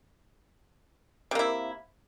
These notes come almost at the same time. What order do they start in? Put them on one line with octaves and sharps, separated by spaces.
C3 A#3 E4